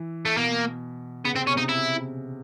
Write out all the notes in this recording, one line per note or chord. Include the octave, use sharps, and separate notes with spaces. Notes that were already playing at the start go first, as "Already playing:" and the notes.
Already playing: E3
A3
B2 A#3
C#3 B3
C3 C4
B2 C#4
C3 D#4
E4